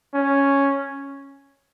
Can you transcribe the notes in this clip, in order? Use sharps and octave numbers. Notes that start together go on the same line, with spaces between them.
C#4